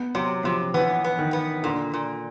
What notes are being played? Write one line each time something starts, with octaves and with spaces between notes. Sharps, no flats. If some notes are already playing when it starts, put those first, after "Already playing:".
Already playing: B3
C3 F#3
C3 F3
E3 B3
B3
D#3
B3
A#2 D3
A#2